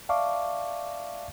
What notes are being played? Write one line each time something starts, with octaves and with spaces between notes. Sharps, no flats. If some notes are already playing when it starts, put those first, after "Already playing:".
D5 E5 F5 A5 C#6 D6